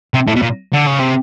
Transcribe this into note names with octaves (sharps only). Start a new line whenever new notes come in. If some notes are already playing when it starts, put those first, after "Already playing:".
C3
A2
B2
A#2
D3
C#3
C3